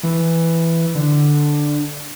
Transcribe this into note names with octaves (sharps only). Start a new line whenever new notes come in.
E3
D3